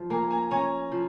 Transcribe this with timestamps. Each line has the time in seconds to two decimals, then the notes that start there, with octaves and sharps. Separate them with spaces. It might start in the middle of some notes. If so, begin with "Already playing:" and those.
Already playing: F3
0.10 A#3 G#5 A#5
0.30 G#5 A#5
0.51 C#4 G#5 A#5
0.92 F3